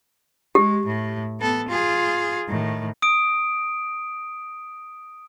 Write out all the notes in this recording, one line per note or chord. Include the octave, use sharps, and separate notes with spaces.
G#3 G4
A2
B3 A4
F4 G#4
A2 D#3
D#6 D7